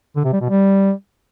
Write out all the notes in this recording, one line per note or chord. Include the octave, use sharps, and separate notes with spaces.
D3
C3
G3
B2
G3